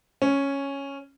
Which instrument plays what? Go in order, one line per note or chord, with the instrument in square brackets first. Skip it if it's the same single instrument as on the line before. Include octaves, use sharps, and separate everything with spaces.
[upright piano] C#4